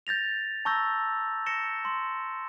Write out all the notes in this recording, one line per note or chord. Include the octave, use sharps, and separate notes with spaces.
G6 A6 A#6 F7
A5 A#5 C#6 E6 G6 A#6
A#6 C#7 E7 G7
C6